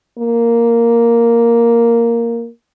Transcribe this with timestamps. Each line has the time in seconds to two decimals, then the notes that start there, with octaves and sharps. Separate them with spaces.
0.19 A#3